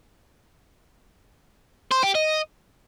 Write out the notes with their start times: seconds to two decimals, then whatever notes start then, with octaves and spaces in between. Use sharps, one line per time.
1.92 C5
2.03 G4
2.15 D#5